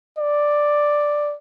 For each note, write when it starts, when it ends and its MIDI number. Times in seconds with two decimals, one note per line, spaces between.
0.18 1.35 74